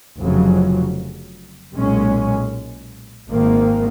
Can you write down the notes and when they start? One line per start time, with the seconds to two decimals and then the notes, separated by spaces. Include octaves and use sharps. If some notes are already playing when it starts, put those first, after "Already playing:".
0.18 F1 F2 C#3 F#3
1.75 B1 A#2 G#3 C#4
3.30 G#1 G#2 D#3 A#3